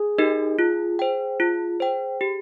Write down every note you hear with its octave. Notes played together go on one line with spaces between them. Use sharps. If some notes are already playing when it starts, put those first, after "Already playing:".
Already playing: G#4
D#4 G4 A#4 D#5
F4
C5 G5
F4
C5 G5
G4